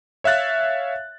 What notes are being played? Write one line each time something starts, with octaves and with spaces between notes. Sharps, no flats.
C#5 E5 F5 F#6 A6